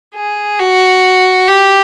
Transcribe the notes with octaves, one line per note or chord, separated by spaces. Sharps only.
G#4
F#4
G4